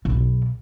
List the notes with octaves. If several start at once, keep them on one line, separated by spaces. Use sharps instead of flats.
B1